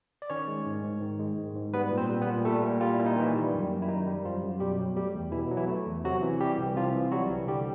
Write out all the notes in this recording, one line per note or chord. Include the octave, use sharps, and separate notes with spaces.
D5
D#3 C#4 C#5
G#3
G#2
G#2
D#3
G#3
G#2
G#2
G3 B3 B4
A#2
C4 C5
G3
B3 B4
A#2
G3 A3 A4
A#2
G3 F4
E4
A#2
D#4
D#3 E3 E4
G3
F#2
F#2
E4
D#3 D#4
G3
F#2 F3 F4
F#2
B2 G3 G4
F#3
G3 A3 G4
E2
B2 E3 E4
F#3
E3 E4
A3
E2
C3 F#3 F#4
E3
G3 G4
C2
C3 F3 F4
E3
F#3 G3 F#4
C2
D3 G3 G4